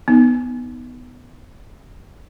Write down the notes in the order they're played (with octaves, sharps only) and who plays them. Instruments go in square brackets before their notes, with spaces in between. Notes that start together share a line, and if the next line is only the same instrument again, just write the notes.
[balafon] B3 D#4